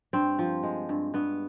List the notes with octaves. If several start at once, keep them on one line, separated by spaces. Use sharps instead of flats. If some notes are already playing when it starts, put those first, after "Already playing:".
G2 C4
F3
G#3
G2
G2 B3